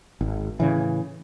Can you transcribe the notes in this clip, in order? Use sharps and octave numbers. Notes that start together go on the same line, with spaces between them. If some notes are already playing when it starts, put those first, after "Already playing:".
G#1
A2 C#3 E3